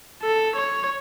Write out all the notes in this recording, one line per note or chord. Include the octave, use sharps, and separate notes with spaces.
A4
C#5